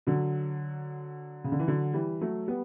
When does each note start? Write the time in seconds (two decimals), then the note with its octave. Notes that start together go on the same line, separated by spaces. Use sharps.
0.07 D3 F#3
1.44 C#3
1.52 D3
1.59 E3
1.67 D3 F#3
1.94 E3 G3
2.21 F#3 A3
2.47 G3 B3